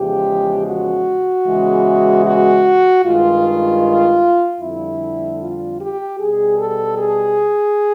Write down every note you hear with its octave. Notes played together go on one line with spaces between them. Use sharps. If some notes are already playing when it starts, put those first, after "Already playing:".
Already playing: E2 C#3 F3 G#3 G4
F#4
E2 C#3 E3 G#3
F#4
G2 D#3 G#3 F4
F2 D3 G3 E4
F4
G4
B2 G3 G#4
A4
G#4